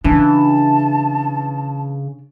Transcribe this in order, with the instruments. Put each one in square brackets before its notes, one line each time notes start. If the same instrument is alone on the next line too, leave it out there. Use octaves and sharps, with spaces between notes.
[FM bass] C#3 [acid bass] E3 [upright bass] D4 [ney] A5